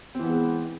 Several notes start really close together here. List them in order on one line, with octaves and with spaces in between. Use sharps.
C4 E3 B3 G#3